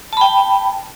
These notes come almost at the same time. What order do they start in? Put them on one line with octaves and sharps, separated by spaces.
A5 B5 G5